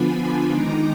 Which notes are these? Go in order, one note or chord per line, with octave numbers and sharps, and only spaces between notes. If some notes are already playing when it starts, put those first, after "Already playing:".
Already playing: D3 F3 B3 D4 F4 G#5 B5
D#3 G#3 D#4 A#5 D6